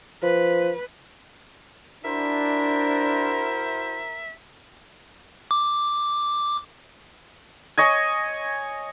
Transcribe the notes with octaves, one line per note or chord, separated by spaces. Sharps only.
F3 B4
D4 E4 F#4 A#4 C5 E5
D6
C#5 D#5 G#5